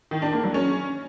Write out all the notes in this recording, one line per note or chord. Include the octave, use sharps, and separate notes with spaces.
D#3
D4
A#3
F#3
C#4